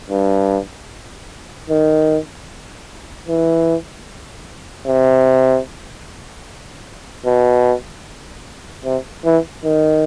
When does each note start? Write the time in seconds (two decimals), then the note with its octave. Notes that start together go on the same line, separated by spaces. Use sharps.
0.10 G2
1.70 D#3
3.28 E3
4.87 C3
7.26 B2
8.85 C3
9.25 E3
9.65 D#3